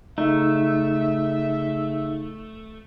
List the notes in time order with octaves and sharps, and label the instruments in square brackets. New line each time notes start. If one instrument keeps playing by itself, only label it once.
[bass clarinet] C#3 [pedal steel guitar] A3 [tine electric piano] D#4 [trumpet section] E5